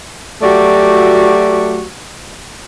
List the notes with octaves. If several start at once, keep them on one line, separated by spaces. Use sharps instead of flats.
F#3 A3 F#4 G4 D5